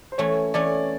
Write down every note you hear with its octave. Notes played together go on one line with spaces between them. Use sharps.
C5
E3 A3 C#4 C#5
E3 A3 C#4 D5